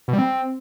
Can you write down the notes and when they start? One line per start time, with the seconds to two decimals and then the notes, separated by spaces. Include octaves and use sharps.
0.08 B2
0.13 G3
0.18 C4